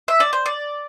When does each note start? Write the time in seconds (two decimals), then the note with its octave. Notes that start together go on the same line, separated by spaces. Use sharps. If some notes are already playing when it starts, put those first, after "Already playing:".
0.08 E5
0.20 D5
0.33 C5
0.46 D5